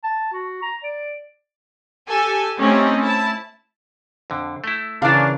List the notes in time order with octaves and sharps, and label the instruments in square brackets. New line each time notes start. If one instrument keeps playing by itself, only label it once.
[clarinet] A5
F#4
A#5
D5
[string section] G4 A4 G#5
A3 C4 C#4 D#4 G4
E4 A5
[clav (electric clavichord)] F2 D3
A3 E4
[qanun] C#3 E3 [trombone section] A#3 C#4 D4 [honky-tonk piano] F5